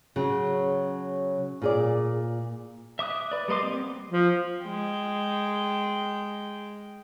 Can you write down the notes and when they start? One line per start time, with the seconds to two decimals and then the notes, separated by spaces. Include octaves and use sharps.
0.16 C#3 F#3
1.62 A#2 G#4 D5
2.99 E5 D6 D#6 F#6
3.32 B4 D5
3.48 G3 A#3 D#5 C6 D6
3.63 B3 C4
4.10 F3
4.65 G#3 G5